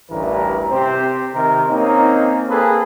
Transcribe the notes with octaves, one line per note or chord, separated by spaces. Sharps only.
A1 D2 G2 E3 A#4
C3 C4 G4 C5
C3 D#3 A#4
A#3 C4 C#4 D#4
A#3 C4 G#4 A4 B4